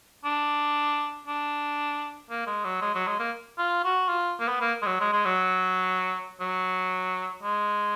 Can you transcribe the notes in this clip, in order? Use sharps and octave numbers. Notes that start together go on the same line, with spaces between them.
D4
D4
A#3
G#3
F#3
G#3
F#3
G#3
A#3
F4
F#4
F4
A#3
B3
A#3
G#3
F#3
G#3
G#3
F#3
F#3
G#3